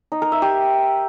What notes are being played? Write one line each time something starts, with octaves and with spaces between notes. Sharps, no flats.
D#4
A#4
E5
G4